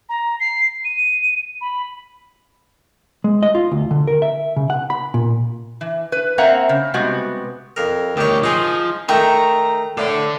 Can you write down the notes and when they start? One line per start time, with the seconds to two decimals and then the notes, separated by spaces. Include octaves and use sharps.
0.09 A#5
0.40 C7
0.85 D#7
1.61 B5
3.24 G#3
3.43 D#5
3.55 F4
3.72 D2
3.91 D3
4.07 A#4
4.22 E5
4.56 C#3
4.70 F#5
4.90 B5
5.14 A#2
5.81 E3
6.12 B4
6.38 A#3 C4 E5 F#5 A#5
6.69 C#3
6.94 C3 G3 G#3 B3 F#4
7.76 F2 A#4
8.17 D2 D#3 G4 C#5
8.44 F3 D#4 G#4
9.09 D#3 A3 G5 A#5 C#6
9.97 A2 D3 A4 D5